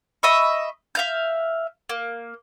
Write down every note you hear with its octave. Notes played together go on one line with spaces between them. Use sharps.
D#5 E5 B5 C#6
E5 F5 G6
A#3